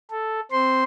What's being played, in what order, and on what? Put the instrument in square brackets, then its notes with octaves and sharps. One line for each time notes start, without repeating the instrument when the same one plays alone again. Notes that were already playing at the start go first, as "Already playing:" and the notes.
[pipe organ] A4
C4 C5 C6